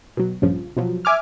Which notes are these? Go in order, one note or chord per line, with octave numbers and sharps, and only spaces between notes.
B2 F#3
A#1 G2 C#3 F3
B2 F3 F#3
E5 G#5 D6 F6